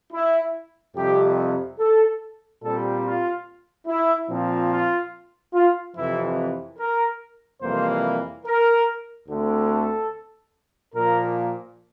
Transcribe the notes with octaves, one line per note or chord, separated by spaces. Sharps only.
E4
F2 C3 G3 G4
A4
A#2 G3 C4 A4
F4
E4
A#2 F3 C4
F4
F4
F2 C3 E3 E4
A#4
F2 C3 E3 G3 A#3 C5
A#4
D2 D3 A3 C4
A4
A#2 F3 A#3 A#4